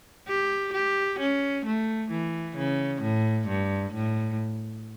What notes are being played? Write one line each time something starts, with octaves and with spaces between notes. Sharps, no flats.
G4
G4
C#4
A3
E3
C#3
A2
G2
A2